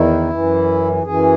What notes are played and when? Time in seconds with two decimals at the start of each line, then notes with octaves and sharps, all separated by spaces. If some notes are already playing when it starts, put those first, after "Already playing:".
Already playing: E2 D#3 E4
0.30 F#2 E3
1.03 F#2 E3 G#4